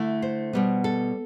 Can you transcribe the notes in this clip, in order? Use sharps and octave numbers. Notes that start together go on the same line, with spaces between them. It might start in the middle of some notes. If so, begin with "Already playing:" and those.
Already playing: D3 A3 E4
C5
B2 G3 B3
A4